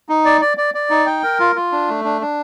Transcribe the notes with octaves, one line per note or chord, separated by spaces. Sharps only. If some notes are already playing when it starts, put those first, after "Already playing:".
D#4
D5
D5
D5
D5
D#4
G5
A#4
F4
F4
D4
A3
D4
D4